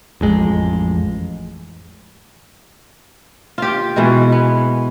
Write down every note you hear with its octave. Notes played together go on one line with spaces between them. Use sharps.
A1 F2 G#3
F4 G4
B2 E3 G#3
B3